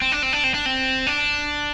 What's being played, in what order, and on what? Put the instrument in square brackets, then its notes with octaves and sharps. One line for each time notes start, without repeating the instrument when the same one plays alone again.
[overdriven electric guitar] C4
D4
C4
D4
C4
D4
C4
D4